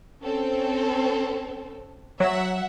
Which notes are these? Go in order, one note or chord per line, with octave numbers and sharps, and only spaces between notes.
C4 C#4 A4
F#3 E5 F#5